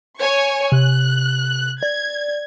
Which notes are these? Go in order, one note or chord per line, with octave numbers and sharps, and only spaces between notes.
C#5 G#5 C#6
C3 F#6
D5 G#6